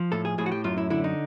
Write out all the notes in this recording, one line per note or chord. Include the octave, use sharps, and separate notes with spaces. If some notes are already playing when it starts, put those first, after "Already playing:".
Already playing: F3
A2 A4
G#4
A2 G#4
F#4
G4
F#2 F4
E4
D3 E4
D#4